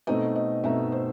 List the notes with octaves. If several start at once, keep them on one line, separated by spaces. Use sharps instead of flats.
B2 A3 C4 D#4 D#5
D#5
B2 A3 C4 D#4 E5
C5